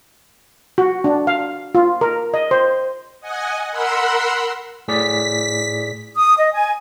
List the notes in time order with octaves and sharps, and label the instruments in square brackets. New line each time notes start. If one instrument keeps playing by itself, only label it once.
[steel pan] F#4
D4
F5
F4
A#4
D#5
C5
[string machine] D#5 F#5 G#5
A#4 F#5 B5 C6 E6
[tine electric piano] A2 G#4 D5 [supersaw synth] B6
[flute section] D#6
D#5
G#5